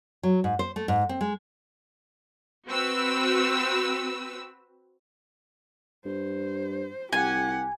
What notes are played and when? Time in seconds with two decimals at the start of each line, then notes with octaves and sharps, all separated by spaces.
0.23 F#3
0.44 G#2
0.59 C5
0.76 A3
0.88 G#2
1.09 C4
1.21 G#3
2.67 C4 F#4 B4 E6
6.05 G2 C5
7.12 C2 G4 F#5 G#5